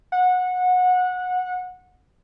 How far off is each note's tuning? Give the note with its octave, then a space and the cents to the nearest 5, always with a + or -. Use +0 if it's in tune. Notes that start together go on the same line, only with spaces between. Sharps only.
F#5 -20